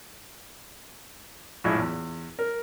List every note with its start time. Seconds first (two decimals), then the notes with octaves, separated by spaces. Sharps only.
1.64 A#1 A2 G#3 E4
1.78 E2
2.39 A#4